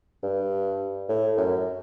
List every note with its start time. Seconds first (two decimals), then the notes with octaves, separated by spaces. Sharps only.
0.23 G2
1.09 A2
1.38 F#2